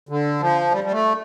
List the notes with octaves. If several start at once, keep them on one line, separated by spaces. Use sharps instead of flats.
D3
F3
G3
G3
A3